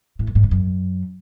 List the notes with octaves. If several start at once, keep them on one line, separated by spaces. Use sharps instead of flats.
A2
F2
G#2
D3
F#2